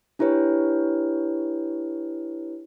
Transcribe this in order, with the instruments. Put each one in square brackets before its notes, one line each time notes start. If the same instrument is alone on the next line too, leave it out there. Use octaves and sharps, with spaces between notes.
[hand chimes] D4 E4 G4 B4 C#5